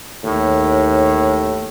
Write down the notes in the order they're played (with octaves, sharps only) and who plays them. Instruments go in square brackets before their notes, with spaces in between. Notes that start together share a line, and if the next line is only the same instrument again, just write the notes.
[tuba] D#2 [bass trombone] A2